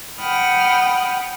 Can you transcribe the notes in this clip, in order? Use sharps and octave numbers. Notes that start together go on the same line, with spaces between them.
F#5 G5 B5 D#6 F6